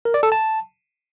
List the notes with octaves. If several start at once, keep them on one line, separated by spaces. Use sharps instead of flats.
A#4
D5
A4
A5